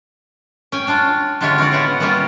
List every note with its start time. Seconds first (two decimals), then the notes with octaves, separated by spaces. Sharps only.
0.72 C#4 G5 G#5
0.87 C#4 D4 F4
1.41 D3 G#3 E4 F4 G4 C#5
1.58 C4 C#4 F4 D5
1.72 A2 B3 E4 F4 C#5 F#5
2.00 G3 A#3 B3 C#4 F4 G4